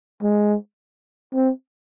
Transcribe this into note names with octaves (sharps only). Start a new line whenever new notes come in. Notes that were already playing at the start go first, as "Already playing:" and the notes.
G#3
C4